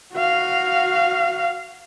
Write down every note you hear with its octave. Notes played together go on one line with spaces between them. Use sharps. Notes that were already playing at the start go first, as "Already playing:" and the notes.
F#4 F5